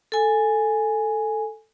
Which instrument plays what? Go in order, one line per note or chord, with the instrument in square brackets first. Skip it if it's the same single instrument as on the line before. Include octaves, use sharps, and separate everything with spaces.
[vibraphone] A4 G#5